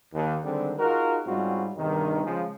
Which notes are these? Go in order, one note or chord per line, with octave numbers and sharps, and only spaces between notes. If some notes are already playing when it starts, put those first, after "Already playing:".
D#2
D3 D#3 G3 G#3 C4
D#4 F4 F#4 G#4 A#4
G#2 G3 C4 C#4 F4 F#4
E2 G2 C3 D#3
C#3 F3 G#3